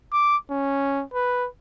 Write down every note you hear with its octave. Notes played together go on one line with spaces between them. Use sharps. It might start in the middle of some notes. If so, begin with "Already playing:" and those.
D6
C#4
B4